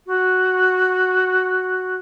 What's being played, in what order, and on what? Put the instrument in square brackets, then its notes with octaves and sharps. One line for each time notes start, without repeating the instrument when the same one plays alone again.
[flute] F#4